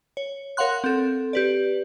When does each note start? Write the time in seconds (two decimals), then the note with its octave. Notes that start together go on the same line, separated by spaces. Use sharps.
0.17 C#5
0.57 A#4 C#5 F5 F#5 C6 F#6
0.84 C4 A4
1.33 G4 B4 D5